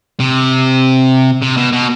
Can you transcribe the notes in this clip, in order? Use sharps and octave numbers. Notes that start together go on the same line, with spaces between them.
C3
C3
B2
B2